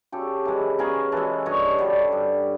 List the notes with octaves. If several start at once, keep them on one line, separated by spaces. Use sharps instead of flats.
C#3 G4 A4
E3 G#3
C#3 G#4 A#4
E3 G#3 A4 B4
G2 C#5 D#5
D3 G3
G2